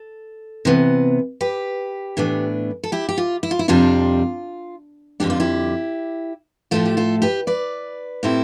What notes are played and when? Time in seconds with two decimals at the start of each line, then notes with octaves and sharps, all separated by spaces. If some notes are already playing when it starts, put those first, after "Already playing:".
Already playing: A4
0.65 C3 E3 B3
1.41 G4 B4
2.17 A2 E3 B3 D4
2.84 A4
2.92 E4 G4
3.09 G4
3.18 F4
3.43 E4
3.51 F4
3.59 E4
3.68 F2 C3 G3 D4 F4
5.20 F2 D3 G3 D4 G4
5.30 F4
5.40 E4 G4
6.71 A2 F3 A3 F4 A4
6.85 G4
6.97 F4 A4
7.22 G4 B4
7.47 B4 D5
8.23 A2 G3 C4 E4